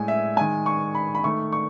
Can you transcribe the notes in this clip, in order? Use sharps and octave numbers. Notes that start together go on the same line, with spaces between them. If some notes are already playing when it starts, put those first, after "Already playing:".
Already playing: A2 G#3 G#5
E5
D#3 G#3 G#5
C#6
B5
B5
D#3 A3 C#6
C#6